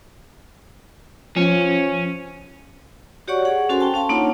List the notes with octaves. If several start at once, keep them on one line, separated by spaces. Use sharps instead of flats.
F3 C#4
F#4 G4 C#5 D5 F#5 C#6
G#4 F#5
C#4 F#4 A4 C5 G#5 C6
G5 A5
C#4 F5 A5 C6
A#3 D4 D#4 F4 C#5 F#5